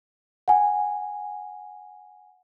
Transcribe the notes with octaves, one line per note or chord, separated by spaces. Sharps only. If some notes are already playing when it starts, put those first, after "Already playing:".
F#5 G#5